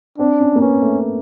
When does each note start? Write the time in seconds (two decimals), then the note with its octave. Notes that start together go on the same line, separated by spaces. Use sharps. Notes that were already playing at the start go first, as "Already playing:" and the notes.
0.18 C4 D4
0.40 C#4
0.55 A#3
0.61 B3 C#4
0.82 A3